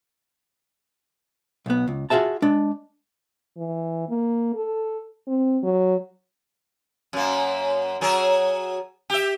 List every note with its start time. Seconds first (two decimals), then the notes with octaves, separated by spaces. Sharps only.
1.66 B1 B3
1.87 C#2
2.10 F4 F#4 G#4 E5 A5
2.42 G#3 D4
3.57 E3
4.09 A#3
4.55 A4
5.27 C4
5.63 F#3
7.13 F#2 A#3
8.01 F#3 G#4 A#4
9.10 G4 E5